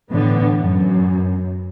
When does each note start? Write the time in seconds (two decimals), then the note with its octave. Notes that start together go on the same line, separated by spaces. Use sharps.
0.11 A2 D3 E3 B3
0.61 F#2